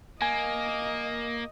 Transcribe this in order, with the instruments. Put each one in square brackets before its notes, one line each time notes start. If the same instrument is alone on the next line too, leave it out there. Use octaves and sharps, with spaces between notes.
[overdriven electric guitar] A#3 [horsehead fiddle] D#5 [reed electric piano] G#5